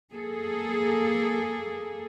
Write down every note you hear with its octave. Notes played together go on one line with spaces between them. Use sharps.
A#3 G#4 A4